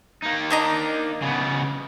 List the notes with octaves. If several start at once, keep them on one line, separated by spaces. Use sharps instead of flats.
A#3 D#4
D4 D#5 A#5
C#3 B3